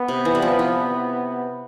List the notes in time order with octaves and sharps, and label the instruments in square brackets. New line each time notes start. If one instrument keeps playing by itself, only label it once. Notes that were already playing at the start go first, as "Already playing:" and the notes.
Already playing: [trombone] B3
[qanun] C3
E3
G3
F3
F3